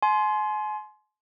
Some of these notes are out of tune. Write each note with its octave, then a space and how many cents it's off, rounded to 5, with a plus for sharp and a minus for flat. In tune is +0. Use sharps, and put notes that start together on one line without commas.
G#5 +40 C6 +0